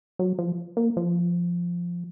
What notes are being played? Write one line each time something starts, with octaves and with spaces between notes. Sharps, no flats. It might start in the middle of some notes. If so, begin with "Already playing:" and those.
F#3
F3
A#3
F3